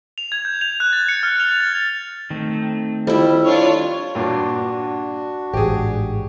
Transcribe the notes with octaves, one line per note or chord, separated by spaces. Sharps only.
F7
G#6
G6
F7
F#6
A6
C#7
F6
F7
A6
D#3 A3 C4
F2 G3 E4
D4 F4 C#5
C#5
G2 A#2 D4 F#4
A1 G#2 G4 G#4